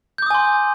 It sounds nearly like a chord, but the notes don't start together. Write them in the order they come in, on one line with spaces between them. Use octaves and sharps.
G6 D6 D#6 G#5 C6